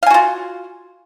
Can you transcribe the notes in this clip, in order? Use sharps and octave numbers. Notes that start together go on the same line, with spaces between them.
F4 F#4 F5 G#5